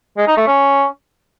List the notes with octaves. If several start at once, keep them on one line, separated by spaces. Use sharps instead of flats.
G#3
D#4
A3
C#4